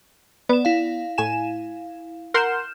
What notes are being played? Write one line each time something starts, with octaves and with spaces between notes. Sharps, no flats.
B3 D5 E7
E4 F5
A2 G#5 E7
A#4 F#5 C6 F6 G6 E7